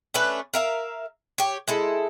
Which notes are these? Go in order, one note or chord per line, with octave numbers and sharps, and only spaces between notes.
A3 C#4 D4 B4
A#4 E5 F5
G4 C#5
G#3 E4 A4